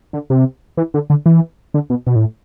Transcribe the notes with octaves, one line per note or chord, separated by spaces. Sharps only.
D3
C3
E3
D3
D3
E3
D3
B2
B2
A2